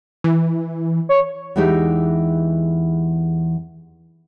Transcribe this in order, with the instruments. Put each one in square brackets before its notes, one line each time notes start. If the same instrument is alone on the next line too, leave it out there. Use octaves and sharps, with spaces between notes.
[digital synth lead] E3
[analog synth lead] C#5
[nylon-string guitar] E2 E3 G#3 D#4 G4 E5